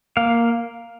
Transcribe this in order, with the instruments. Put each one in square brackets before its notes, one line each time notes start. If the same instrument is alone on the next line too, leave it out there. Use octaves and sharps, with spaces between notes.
[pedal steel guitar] A#3 F5